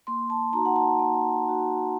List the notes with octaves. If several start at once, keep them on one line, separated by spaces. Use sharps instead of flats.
A#3 C6
A5
D#4 F#4 A#5
F#5
A5
A#3
D#4 F#4